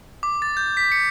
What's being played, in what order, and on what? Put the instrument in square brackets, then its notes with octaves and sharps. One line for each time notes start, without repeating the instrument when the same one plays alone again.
[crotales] D6
A6
G6
B6
C#7